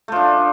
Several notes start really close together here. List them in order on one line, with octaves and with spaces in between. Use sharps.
A3 F3 D4